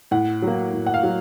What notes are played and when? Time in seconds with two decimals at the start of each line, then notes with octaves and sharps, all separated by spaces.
0.11 A2 F#5
0.42 F#3 A#3
0.74 A2
0.86 F#5
0.94 F5
1.03 F#3